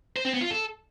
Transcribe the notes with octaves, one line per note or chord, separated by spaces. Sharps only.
C5
C4
B3
F4
A4